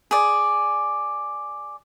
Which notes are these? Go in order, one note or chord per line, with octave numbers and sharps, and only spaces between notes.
G#4 D5